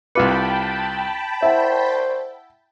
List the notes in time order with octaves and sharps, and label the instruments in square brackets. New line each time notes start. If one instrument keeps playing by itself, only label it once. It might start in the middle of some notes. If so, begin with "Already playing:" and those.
[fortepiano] C2 F4 B4 [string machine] G5 A5 B5 [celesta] D6 C#7
[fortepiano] E4 [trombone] C5 [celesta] E5 F#5